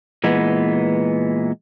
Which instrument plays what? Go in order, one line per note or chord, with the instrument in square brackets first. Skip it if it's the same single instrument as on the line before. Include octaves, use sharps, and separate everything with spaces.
[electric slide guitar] A#2 E3 G#3 B3